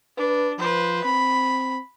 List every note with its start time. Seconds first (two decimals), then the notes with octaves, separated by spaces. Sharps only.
0.18 D4 B4
0.59 F3 B4 C5
1.04 C4 B5